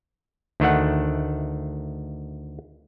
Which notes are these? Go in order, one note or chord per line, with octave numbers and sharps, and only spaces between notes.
D2 D#3 A3 F#5